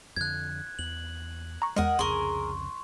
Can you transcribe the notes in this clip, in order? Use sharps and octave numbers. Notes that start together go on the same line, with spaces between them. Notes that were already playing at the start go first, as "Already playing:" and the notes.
F2 D3 F#6 G#6
E2 F#7
A#5 C#6
E2 G#3 A#4 D#5 F#5
C2 F2 C#3 G#4 A#4 C6 C#6